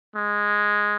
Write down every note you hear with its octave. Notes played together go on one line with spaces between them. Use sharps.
G#3